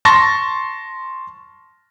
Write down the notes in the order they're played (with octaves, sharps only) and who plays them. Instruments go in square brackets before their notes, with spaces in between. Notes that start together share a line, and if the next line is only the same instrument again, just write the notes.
[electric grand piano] A5 C6 C#6 A6 A#6